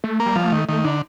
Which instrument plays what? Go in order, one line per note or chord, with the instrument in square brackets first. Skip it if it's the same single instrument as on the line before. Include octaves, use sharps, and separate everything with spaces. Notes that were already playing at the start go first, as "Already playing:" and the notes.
[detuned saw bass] A3
[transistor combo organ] A#3
[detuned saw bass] G3
[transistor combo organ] F3
[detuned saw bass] A#3
A3
[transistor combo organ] D#3
[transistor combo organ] D#3 [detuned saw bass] A3
[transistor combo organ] D3 [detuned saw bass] D#4